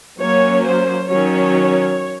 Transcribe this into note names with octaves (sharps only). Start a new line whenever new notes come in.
F#3 A#3 C#4 C#5
C5
D#3 F#3 C#4 C#5